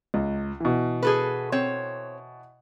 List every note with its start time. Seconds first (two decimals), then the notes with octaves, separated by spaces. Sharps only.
0.14 C#2
0.60 B2 E3
1.03 G#4 A4 B4
1.52 C4 C#5